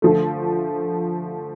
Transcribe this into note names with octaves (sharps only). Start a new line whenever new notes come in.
D3 F3 A3